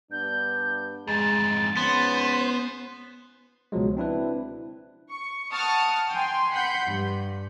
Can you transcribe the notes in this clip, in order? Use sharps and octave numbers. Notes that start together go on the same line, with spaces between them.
G2 B3 D4 G6
F2 G#2 G#3 A6
G#2 F3 B3 C#4 C5
C#2 B2 F3 F#3 G#3
C4 D4 E4 B4
C#6
F#5 A5 C#6 D#6 F6
G5 G#5 C6
F#5 B5 C6 G6
G2